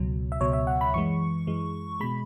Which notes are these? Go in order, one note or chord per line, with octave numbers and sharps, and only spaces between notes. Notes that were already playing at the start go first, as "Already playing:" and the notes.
Already playing: C#2 B2 F#3
E5
C#2 B2 F#3 C#5
E5
F#5
B5
F#2 E3 G#3 C#6
F#2 E3 G#3
B2 G#3 B5